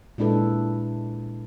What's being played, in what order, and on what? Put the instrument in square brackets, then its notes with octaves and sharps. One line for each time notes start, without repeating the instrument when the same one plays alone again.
[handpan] A#2 G#3 D4 E4 A4 B4